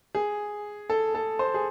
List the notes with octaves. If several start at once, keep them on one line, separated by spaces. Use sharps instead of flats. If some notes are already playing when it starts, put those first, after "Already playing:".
G#4
A4
A4
C5
G#4